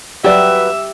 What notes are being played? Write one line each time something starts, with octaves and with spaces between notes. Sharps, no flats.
F#3 G4 B4 D5 E5